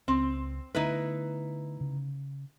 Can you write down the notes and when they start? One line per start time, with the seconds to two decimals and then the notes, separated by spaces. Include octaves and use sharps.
0.08 C#2 C4
0.75 D3 A3 B3 D#4 E4 B4
1.81 C#3